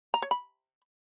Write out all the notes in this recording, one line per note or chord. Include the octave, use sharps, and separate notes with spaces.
A#5
C#5
B5